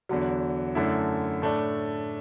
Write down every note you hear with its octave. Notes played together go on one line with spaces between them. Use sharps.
E2 D3 F#3
F#2 D3 A3 E4
A2 A3 D4